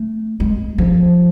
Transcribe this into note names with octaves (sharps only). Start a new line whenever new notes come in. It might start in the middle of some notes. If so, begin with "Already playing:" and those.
Already playing: A3
G#3
F3